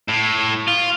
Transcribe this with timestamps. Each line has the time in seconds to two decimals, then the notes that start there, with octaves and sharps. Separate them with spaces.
0.09 A2
0.67 F4